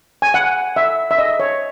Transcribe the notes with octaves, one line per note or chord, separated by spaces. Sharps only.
G#5
F#5
E5
E5
D#5
C#5